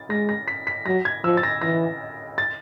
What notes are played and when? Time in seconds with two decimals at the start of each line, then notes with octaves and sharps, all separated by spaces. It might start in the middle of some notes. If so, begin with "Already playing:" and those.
Already playing: A6
0.09 G#3 A#6
0.29 A#6
0.48 B6
0.67 B6
0.86 F#3 A#6
1.05 G#6
1.24 F3 E6
1.37 A6
1.43 A#6
1.62 E3 A#6
2.38 A6